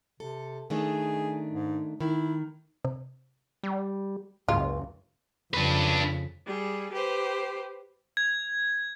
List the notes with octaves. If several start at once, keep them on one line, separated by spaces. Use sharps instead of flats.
C3 A4
D#3 A3 D4 G#4
G#2
D#3 E4
C3
G3
F#1 C#2 G#2 F4
F2 C#3 D4 B4
G3 G#4
G4 B4 C5
G#6